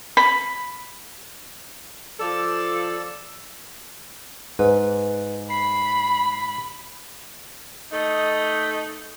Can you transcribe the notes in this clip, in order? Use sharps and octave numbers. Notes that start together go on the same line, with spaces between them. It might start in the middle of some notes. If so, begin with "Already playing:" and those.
B5
F3 A4 D5 E6
G#2 B4
B5 C7
A3 D#4